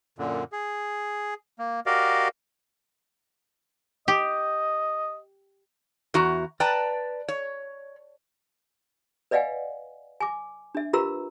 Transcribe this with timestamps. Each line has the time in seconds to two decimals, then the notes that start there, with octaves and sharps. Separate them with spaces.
0.18 F#2 A#2 D3
0.52 G#4
1.59 A#3
1.86 F#4 G4 A#4 D5 D#5 F5
4.08 G4 D#5
6.14 E2 F#4 A#5
6.60 B4 D5 G5 A5 A#5
7.29 C#5
9.31 B4 D5 D#5 F5 F#5 G#5
10.20 G#5 D6
10.75 D4 E5
10.93 F4 G4 A#4 B4 A#5 E6